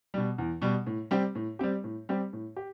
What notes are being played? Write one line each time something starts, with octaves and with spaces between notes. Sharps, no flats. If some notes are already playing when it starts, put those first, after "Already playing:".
B2 G3
E2
B2 G3
A2
G3 C4 G4
A2
G3 C4 G4
A2
G3 C4 G4
A2
G4